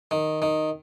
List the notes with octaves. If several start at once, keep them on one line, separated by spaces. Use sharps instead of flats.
D#3
D#3